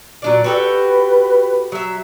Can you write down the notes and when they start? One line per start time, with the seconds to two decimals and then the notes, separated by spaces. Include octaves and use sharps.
0.22 A#2 F#3 D4 D5
0.44 F#4 G4 A4 B4
1.72 F#3 E5